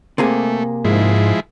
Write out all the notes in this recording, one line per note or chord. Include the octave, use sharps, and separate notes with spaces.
C3 A3 A#3 G#4
G#2 F3 G#3 E4